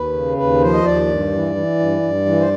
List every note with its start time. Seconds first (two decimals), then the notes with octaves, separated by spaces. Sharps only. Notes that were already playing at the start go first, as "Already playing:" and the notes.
Already playing: D#2 B4
0.13 C#3
0.37 D#2 B4
0.61 F3 C5
0.74 D#5
0.84 D#2 D5
1.08 G2
1.32 E3
1.55 E3
1.79 G2
2.02 G2
2.25 E3
2.40 C5